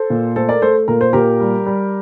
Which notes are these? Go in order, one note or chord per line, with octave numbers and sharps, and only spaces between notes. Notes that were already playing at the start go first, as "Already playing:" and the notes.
Already playing: A4 C5
A#2
A3 A4 C5
A#4 D5
A3 A4 C5
A#2 A#4
C5
A#2 G4 A#4
G3
G3